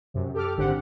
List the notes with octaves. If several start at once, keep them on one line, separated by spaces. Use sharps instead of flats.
F#2 C3
G4 A4 D6 F6
G#1 D3 C4 G4 F#5